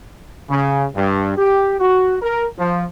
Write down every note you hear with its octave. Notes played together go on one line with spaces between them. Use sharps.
C#3
G2
G4
F#4
A#4
F3